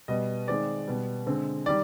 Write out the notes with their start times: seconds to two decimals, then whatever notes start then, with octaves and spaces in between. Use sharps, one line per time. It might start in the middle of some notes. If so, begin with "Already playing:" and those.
0.08 B2 G3 B3 D#5
0.48 D#3 G#3 C4 D5
0.87 B2 G3 B3
1.26 D3 G#3 C4
1.66 D#3 G3 D5